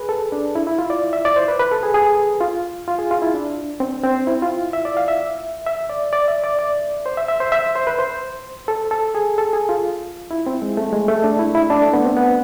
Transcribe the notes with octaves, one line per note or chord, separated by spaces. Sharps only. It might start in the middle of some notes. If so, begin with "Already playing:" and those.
Already playing: G#4 B4
A4
D4
E4
E4
F4
D5
E5
D5
C5
B4
B4
A4
G#4
G#4
F4
F4
G#4
F4
E4
D4
C4
C4
E4
F4
E5
D5
F5
E5
E5
D5
D5
E5
D5
D5
C5
E5
E5
C5
E5
C5
B4
C5
A4
A4
G#4
A4
G#4
F4
E4
C4
G#3
A3
G#3
A3
D4
E4
E4
D4
A3
B3
C4
B3